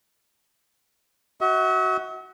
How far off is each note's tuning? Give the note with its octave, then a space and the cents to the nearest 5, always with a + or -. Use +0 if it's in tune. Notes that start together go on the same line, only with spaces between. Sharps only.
F#4 +10 E5 -45